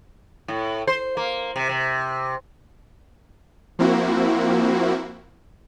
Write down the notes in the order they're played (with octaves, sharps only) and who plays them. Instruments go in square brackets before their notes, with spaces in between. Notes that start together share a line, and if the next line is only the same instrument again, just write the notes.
[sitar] A2
C5
A#3
C3
C3
[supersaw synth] F3 A#3 C4 E4 F#4